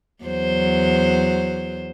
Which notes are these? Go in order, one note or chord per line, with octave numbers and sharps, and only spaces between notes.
E2 F#3 C5